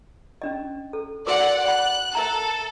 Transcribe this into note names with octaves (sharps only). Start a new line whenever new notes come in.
C#4 D4 D#5
A4
F#4 A#4 D5 F#5 D6
F#5 B5 F#6
A4 A#4 E5 A#5